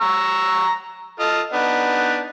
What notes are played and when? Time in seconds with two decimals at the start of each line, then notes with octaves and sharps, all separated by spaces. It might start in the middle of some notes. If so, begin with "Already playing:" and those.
0.01 A#5 C#6 E6
1.20 F4 A4 D#5
1.53 B3 D4 D#4